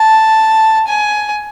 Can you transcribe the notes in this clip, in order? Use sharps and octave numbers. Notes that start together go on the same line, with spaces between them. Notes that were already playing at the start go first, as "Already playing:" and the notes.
Already playing: A5
G#5